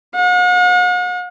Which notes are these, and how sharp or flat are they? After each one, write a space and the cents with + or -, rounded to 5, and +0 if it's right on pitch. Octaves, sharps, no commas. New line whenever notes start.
F#5 -45